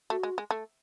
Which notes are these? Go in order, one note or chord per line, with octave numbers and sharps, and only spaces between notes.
A3 F#4
G#3
G#3
A3